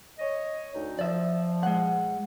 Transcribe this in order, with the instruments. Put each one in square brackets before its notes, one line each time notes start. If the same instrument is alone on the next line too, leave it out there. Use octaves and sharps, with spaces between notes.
[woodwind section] C#5 D#5
D2 D#4
[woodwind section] F3 [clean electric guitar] D5 E5
[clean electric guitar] G#3 F#5